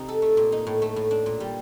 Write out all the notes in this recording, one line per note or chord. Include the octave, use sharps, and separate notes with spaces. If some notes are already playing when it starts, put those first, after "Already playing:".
Already playing: C3 D#4
A4
A3
A#2
D#4
A2
A3
A2
D4
A#2
G3